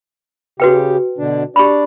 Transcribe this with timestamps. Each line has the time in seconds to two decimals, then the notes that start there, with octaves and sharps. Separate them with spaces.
0.60 C#3 F#4 G4 B4 G5
1.18 B2 D3 D4
1.56 D4 G4 D5 B5